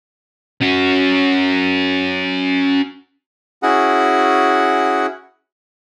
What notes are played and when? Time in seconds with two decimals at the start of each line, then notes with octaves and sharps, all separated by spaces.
0.61 C#4 F#4
3.63 C#4 E4 F#4 G#4 F#5